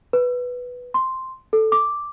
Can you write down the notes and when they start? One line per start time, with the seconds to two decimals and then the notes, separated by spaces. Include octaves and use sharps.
0.13 B4
0.94 C6
1.53 A4
1.72 D6